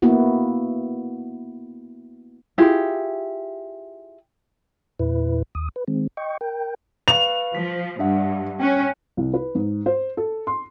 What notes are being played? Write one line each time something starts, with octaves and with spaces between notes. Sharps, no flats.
A#3 B3 E4 F#4
E4 F4 G4 G#4
E2 A#2 E4 B4
D#2 D#6
B4
D#3 G#3 C4
D#5 G5 C#6
A#4 G5
B4 F5 C#6 F7
F3 B6
G2 D4 E5 F#5
C#4 G5 G#5 F#6
C2
B4
G#2
C5
A4
C6